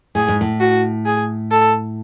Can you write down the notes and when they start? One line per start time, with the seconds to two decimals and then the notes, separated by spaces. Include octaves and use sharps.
0.15 A2 G#4
0.28 G#2
0.41 A2
0.60 F#4
1.05 G#4
1.51 A4